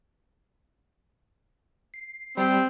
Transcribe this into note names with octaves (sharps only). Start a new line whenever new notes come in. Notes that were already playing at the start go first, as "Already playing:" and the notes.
C7
G3 C4